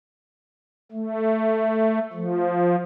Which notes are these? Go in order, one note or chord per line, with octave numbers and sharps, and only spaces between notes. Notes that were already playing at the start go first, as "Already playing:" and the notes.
A3
F3